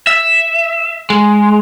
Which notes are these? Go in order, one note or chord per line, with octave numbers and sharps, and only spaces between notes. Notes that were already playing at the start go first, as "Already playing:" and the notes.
E5
G#3